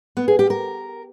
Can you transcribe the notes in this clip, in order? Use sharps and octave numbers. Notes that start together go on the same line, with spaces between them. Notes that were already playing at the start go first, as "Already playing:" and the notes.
B3
G#4
G4
A#4